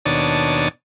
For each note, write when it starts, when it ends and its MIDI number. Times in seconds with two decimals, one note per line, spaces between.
0.06 0.68 39
0.06 0.68 47
0.06 0.68 62
0.06 0.68 73
0.06 0.68 81
0.06 0.68 87